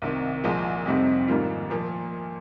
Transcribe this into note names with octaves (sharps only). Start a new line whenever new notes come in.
C2 C3 D#3
C2 A#2 F3 G#3
F2 C3 G3 C4 D#4
G#2 D#3 G3 A#3 F4
A#2 F3 A#3